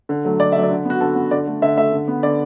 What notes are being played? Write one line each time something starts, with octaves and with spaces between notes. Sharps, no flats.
D3
F#3 A3
D3 D5
F#3 A3 E5
D5
D3
B3
F#4
D3 A4
B3
D3 D5
A3
D3 E5
A3 E5
D3
B3
D3 D5